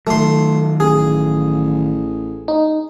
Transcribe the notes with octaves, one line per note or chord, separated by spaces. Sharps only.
D#3 F#3 A3 C6
A1 G#4
D#4